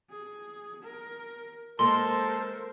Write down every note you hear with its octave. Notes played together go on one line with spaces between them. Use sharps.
G#4
A#4
G#3 A#3 A4 A#4 C5 C6